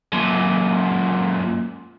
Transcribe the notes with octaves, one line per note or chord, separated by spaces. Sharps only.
F#2 A#2